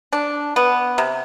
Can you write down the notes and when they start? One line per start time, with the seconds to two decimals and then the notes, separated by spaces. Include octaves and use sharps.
0.13 D4
0.56 B3
0.98 C3